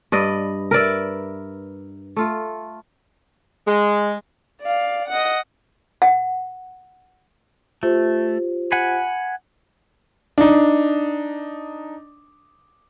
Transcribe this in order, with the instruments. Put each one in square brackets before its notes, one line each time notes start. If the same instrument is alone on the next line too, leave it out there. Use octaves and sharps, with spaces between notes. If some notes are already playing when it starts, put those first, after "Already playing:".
[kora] G2 B4 D5 D#5
A#4 B4 D5 E5
A3 F4
[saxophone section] G#3
[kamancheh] D5 F5
D#5 F#5
[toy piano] F#5
[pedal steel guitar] A3 [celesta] F4 G4 C5
[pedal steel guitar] F#5 G#5 B5
[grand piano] D4 D#4